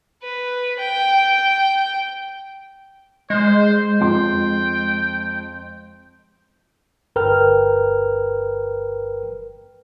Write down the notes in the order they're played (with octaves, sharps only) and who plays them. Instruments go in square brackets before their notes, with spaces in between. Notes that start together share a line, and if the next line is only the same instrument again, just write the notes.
[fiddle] B4
G5
[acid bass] G#3 [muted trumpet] C5
[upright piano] F2 C6 [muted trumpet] G5
[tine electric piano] G1 A#4 B4 G5 F6